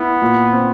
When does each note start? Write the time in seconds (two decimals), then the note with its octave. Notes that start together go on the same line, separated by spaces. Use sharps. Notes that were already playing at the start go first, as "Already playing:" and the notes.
Already playing: B3 E4
0.22 A#2
0.53 C4